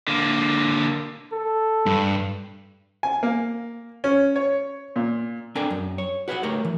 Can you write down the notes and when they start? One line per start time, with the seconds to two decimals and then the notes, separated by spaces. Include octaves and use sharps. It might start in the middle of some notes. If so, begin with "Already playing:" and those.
0.08 D3 A#3
1.33 A4
1.86 G2
3.03 G#5
3.23 A#3
4.04 C#4
4.36 C#5
4.96 A#2
5.55 C4 D4 A4 A#4 G5 G#5
5.70 F#2
5.98 C#5
6.28 F#4 B4 C#5 E5 F#5
6.43 A3 G4 A#4 C#5
6.65 E3